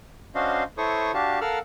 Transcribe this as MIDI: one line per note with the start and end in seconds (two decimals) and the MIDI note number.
0.35 0.63 61
0.35 0.63 62
0.35 0.63 66
0.35 0.63 72
0.35 0.63 75
0.35 0.63 77
0.78 1.11 64
0.78 1.11 69
0.78 1.11 72
0.78 1.11 73
0.78 1.11 85
0.78 1.11 87
1.14 1.39 62
1.14 1.39 66
1.14 1.39 67
1.14 1.39 77
1.14 1.39 81
1.41 1.59 69
1.41 1.59 70
1.41 1.59 77
1.41 1.59 78
1.41 1.59 88
1.41 1.59 89